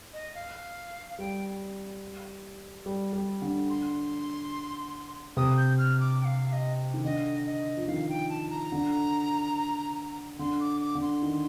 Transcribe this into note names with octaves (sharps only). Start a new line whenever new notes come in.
D#5
F5
F5
G3 G5
G3
G3
D3
C6
C3 D#6
G6
F6
D6
G5
F5
F5
D#5
D#3
D3 D#5
D#5
F3
D#3 F5
G5
A5
A#5
D3
D3 C6
D6
D6
D3
C6
D#3